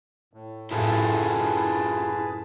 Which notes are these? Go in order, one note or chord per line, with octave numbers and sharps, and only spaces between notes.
A2
F#2 A2 E4 F4 G4 G#4 B4 A5